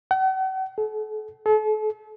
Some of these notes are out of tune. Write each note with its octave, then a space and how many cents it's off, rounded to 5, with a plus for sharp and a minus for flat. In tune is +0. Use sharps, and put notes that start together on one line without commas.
F#5 +45
A4 -40
A4 -40